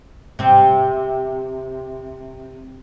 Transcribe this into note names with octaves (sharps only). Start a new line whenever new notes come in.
C3 C4